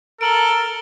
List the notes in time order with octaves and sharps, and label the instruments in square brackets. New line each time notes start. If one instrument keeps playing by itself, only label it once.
[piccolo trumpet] A4 [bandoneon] A#4 [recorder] A#5 [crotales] D7 F#7 G7